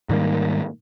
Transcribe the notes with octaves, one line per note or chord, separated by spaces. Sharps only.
G#2 D#3 G3 A#3